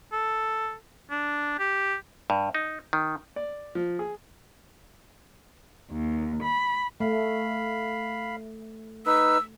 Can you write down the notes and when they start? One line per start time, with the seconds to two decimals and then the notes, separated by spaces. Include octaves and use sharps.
0.12 A4
1.10 D4
1.59 G4
2.30 G2
2.55 D#4
2.93 D#3
3.36 D5
3.75 F3
3.99 G#4
5.89 D#2
6.42 B5
7.00 A3 F5 B5
9.06 D#4 B4 E6